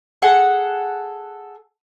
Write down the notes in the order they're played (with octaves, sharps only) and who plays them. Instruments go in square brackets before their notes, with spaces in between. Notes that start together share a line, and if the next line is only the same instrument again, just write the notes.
[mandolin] G#4 A4 F#5